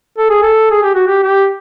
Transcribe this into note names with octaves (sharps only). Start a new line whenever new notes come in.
A4
G#4
A4
G#4
G4
F#4
G4
G4